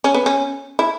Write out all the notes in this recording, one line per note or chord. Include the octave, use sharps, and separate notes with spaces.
C#4
B3
C#4
E4